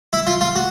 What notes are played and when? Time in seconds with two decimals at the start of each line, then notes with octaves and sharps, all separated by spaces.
0.13 E4
0.27 F4
0.41 F4
0.56 F#4